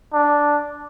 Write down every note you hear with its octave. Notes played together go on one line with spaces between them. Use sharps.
D4